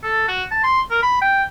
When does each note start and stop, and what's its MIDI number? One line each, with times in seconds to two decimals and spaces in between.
0.04 0.27 69
0.28 0.44 66
0.51 0.61 81
0.64 0.81 84
0.91 1.02 70
1.03 1.18 83
1.22 1.44 79